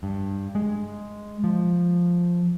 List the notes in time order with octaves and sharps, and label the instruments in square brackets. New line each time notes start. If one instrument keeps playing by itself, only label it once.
[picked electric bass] G2
G#3
F3